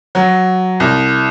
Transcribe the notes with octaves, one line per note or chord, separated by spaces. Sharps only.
F#3
C2